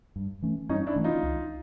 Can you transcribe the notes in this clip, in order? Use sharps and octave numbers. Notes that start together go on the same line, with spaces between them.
G2
E3 A3 C#4
G2 C#4 D#4
D4 E4
E3 A3 C#4
D#4 F4
C#2